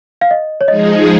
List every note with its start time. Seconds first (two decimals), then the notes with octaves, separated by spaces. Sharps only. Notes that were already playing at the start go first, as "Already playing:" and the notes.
0.21 F5
0.31 D#5
0.61 C#5
0.68 F3 G#3 D#4 G#4 D#5